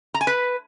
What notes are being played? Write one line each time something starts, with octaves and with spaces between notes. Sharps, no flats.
A#5
G#5
B4